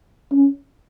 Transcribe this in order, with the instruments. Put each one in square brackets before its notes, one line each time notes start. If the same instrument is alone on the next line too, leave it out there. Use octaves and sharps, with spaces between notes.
[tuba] C#4